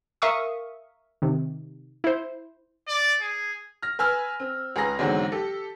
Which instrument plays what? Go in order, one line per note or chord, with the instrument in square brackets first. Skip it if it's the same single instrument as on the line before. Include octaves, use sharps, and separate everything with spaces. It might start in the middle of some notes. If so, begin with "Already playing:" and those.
[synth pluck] A#4 E5 F5 C#6 D#6
C3 D#3
E4 C5
[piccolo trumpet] D5
G#4
[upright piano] F6 A#6
B4 G#5 E6 F6
C4
C#2 G#4 B4 A#5 A#6
E2 G#2 D3 F#3 G#3 C4
G4 A4